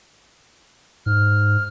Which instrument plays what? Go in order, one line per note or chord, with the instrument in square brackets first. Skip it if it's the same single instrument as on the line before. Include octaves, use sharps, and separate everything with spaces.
[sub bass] G#2 [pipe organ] F6